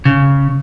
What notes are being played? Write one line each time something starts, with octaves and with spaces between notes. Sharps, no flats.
C#3